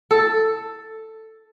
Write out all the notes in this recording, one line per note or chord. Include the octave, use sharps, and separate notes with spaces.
A4